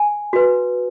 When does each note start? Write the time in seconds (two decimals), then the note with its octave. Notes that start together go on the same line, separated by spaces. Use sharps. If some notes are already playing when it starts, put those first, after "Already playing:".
Already playing: G#5
0.33 F#4 B4